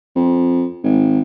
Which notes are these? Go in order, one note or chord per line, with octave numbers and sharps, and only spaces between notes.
F2
G#1